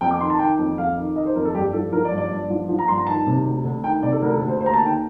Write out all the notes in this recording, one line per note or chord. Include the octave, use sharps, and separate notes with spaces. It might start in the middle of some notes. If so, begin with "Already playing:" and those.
F2 G5
D6
D#3 C6
A5
D#3 G5
F2
F2 F5
D#3
D#3 D#5
C5
F2 A#4
A4
G2 G4
F3 A4
F3 A#4
D5
G2
D5
G2
F3
F3
A#5
G2 C6
A#5
D#3 A5
C3
D2
D2
D#3 G5
C3 D5
A4
D2 A#4
A4
D2
C5
D#2 C5
A#5
A5
D#3
G5